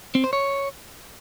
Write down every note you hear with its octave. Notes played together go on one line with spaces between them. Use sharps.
C4
C5
C#5